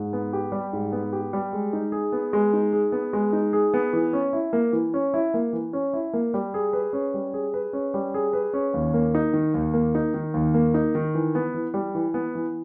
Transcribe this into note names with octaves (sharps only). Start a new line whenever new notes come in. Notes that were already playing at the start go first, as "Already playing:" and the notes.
Already playing: G#2
B3
G4
G3
G#2
B3
G4
G3
G#3
D#4
G#4
B3
G#3
D#4
G#4
B3
G#3
D#4
G#4
B3
E3
C#4
E4
A#3
E3
C#4
E4
A#3
E3
C#4
E4
A#3
G3
G#4
B4
C#4
G3
G#4
B4
C#4
G3
G#4
B4
C#4
D#2
A#3
D#4
D#3
D#2
A#3
D#4
D#3
D#2
A#3
D#4
D#3
E3
B3
E3
G3
E3
B3
E3